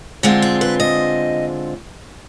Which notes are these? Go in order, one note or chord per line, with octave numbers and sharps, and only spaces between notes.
D3 G#3 C4 F4
G#4
B4
D#5